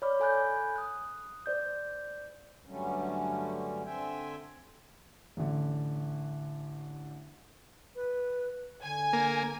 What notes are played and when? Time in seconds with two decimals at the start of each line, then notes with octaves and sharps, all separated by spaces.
0.02 C#5 D5 B5 D6 F6
0.20 A4 G#5 B5 F#6 G6
0.76 D#6 F#6
1.46 C5 D5 G6
2.66 G2 D3 F#3 G3 A3 C#4
3.84 D3 C4 E5 G5 G#5
5.37 A1 D3
7.96 B4
8.83 D3 G#5
9.13 A#3